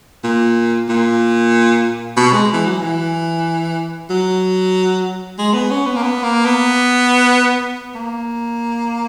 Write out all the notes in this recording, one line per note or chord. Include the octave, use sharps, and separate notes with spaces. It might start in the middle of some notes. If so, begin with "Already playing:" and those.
A#2
A#2
B2
G#3
E3
F#3
E3
F#3
G#3
B3
C#4
B3
A#3
B3
A#3
B3
A#3